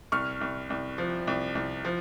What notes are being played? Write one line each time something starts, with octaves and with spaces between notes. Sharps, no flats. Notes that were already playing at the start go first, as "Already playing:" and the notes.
C2 C#6 F6
C2
C2
F3
C2
C2
F3